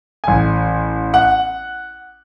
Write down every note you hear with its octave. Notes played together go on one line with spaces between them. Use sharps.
A1 G#5
F#5